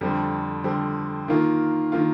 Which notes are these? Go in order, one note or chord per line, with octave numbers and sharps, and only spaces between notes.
F2 D3 G3 C4
F2 D3 G3 C4
D#3 A#3 F4
D#3 A#3 F4